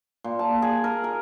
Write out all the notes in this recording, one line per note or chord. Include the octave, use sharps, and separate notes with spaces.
A#2
A5
G#4
A#4
A#4